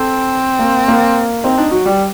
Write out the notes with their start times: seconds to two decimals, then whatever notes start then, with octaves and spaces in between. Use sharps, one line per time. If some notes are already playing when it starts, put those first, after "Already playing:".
Already playing: C4 A4
0.59 A#3
0.88 A#3
1.44 C4 D#4
1.57 D4 D#4
1.71 F#3 F#4
1.86 G3